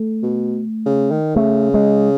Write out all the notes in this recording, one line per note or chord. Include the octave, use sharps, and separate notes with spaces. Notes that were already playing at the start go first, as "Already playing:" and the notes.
Already playing: A3
B2
C#3
D#3
C#3 A3
G#3